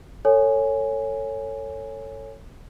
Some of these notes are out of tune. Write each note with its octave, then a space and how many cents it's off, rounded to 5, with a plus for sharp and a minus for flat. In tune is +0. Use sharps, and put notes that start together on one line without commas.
A4 +25 C#5 +0 G#5 +0